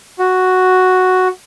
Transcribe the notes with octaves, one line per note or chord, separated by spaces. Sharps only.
F#4